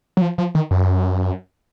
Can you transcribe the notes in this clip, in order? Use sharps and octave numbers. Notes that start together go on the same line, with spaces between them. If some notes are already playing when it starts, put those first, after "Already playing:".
F#3
F3
F3
D#3
F#2